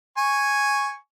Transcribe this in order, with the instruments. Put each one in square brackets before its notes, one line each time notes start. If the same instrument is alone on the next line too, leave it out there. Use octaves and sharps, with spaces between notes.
[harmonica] G#5 C#6